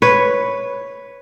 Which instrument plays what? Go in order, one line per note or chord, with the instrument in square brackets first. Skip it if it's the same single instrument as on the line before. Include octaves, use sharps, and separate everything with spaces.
[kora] B4 C#5